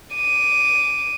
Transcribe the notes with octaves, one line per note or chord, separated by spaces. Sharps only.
D6 D#7